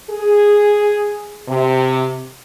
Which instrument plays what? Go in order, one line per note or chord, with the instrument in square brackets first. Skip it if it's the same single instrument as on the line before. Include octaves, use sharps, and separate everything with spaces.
[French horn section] G#4
C3